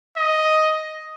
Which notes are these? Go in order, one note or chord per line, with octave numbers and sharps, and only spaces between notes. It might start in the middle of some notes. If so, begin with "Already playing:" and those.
D#5